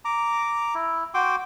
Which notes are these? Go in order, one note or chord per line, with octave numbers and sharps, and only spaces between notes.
A#5 D6
E4
F#4 G5 C6 D6